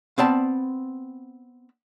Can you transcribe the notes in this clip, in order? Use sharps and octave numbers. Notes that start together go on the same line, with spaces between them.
B3 C4 D5 A5